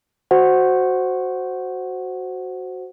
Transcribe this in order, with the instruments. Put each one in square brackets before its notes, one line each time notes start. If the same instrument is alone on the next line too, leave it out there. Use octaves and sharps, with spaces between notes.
[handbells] F#4 C5 F#5